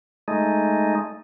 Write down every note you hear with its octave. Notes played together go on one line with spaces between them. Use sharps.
G#3 A3 D#4